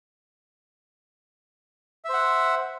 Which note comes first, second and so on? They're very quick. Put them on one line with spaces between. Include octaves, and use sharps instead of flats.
E5 C5 F#5